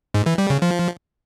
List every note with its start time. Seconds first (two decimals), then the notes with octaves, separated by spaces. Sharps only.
0.14 G#2
0.26 E3
0.38 G3
0.50 C#3
0.62 F3